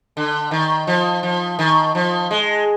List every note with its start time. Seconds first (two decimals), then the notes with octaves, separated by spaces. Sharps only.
0.17 D3
0.51 D#3
0.87 F3
1.23 F3
1.59 D#3
1.95 F3
2.31 G#3